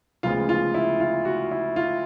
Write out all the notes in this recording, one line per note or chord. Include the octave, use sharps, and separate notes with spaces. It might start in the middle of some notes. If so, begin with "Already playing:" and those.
D2 C#3 F3 G#3 B3 F4
F4
E4
F4
F#4
E4
F4